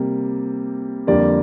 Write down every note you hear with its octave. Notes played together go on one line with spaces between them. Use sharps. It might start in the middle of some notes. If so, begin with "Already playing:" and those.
Already playing: C3 G3 A#3
F2 D3 G3 A#3 D5